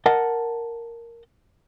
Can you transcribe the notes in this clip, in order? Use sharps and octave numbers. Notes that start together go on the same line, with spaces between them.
A#4 D#5 F#5 A5